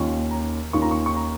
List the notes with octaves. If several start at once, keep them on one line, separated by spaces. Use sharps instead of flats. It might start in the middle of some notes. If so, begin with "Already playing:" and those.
Already playing: D#2 D#3 C#4 F4 C#6
A#5
D#2 D#3 C#4 F4 C#6
A#5
C#6
C#6
A#5